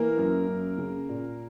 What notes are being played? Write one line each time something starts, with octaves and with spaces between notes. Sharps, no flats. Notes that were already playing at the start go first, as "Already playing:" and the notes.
Already playing: E3 A#3 A#4
F#2
F#2
C#3
A#2